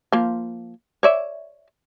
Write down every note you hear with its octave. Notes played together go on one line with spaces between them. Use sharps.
F3 A#3
C#5 D5 E5